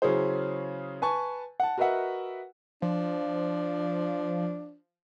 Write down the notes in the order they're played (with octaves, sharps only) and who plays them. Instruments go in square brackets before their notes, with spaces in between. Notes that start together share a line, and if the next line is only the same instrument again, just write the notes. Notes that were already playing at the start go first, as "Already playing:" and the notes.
[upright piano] C#3 F#3 C#4 E4 G#4 C5
B4 G#5 A5 C#6
F#5 A5
F#4 A#4 B4 D#5 E5 F#5
[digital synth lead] F3 [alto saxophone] D4